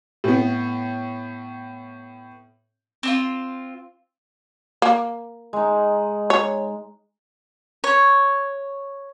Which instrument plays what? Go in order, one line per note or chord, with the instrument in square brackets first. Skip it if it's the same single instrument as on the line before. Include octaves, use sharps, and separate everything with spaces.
[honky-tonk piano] A2 B3
[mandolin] C4 D4 F4
[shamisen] A#3
[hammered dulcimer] G#3 D#4
[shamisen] C#5
[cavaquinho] C#5